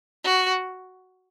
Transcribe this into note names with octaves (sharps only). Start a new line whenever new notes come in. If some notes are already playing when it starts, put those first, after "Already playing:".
F#4